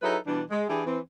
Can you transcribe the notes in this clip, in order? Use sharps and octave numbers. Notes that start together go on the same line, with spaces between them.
F#3 D#4 E4 G#4 A4 B4
B2 E3 G3 D4
G#3
E3 D4 E4 G4 G#4
E3 C4